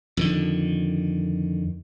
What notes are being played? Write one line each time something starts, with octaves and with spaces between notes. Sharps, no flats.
F2 D3 D#3